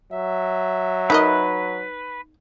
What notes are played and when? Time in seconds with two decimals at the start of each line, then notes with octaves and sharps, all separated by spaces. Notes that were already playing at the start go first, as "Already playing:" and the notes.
0.12 F#3 E5
1.10 D#4 A#4 B4 D#5